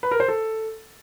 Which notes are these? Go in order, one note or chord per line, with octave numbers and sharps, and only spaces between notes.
B4
A#4
C5
A4